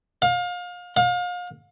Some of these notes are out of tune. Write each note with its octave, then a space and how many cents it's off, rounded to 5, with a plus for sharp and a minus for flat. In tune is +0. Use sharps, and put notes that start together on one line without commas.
F5 +30
F5 +35